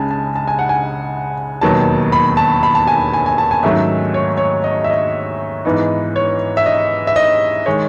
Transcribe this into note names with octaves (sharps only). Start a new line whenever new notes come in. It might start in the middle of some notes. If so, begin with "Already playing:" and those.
Already playing: C#2 C#3 G#3 G#5 A5
A5
A5
G#5
F#5
G#5
E1 D#2 D#3 F#3 B3 A5
B5
A5
B5
A5
G#5
G#5
G#5
A5
G#5
G#2 D#3 F#3 A3 C#4 E5
C#5
C#5
D#5
E5
D#5
G#2 E3 B3 D#4
C#5
E5
D#5
E5
D#5
D#3 G#3 C#5